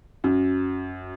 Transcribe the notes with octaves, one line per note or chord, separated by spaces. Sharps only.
F#2